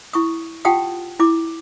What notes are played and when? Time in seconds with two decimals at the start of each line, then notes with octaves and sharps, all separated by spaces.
0.13 E4 C#6 D#6
0.65 F4 G4 F#5 G5 A5 D#6
1.20 E4 D6